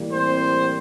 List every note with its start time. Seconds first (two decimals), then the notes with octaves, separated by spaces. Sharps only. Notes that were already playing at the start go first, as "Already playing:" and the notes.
Already playing: A2 E3 G3 A#3
0.13 C4 C5